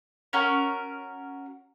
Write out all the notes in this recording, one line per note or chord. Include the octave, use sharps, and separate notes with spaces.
C#4 F#4 A#4